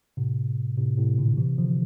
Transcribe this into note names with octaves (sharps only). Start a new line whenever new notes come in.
A2 C3
A2 C3
A2 C3
A#2 D3
C3 E3
D3 F3